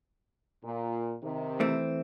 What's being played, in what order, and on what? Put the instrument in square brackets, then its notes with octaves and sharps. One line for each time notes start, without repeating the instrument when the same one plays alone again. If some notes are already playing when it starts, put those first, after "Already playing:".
[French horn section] A#2
C3 D#3
[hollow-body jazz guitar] E3 A3 C4